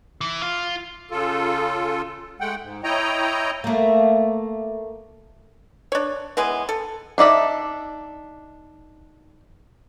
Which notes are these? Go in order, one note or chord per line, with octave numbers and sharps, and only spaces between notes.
E3
F4
C#3 F4 A4
G#3 A3 F#5 G5
G#2
E4 C#5 D#5 G5 A#5
A3 A#3
D4 C#5
E3 G#3 B3 G#5
A4
D4 D#4 D5 E5